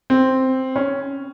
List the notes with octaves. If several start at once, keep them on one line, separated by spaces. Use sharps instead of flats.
C4
C#4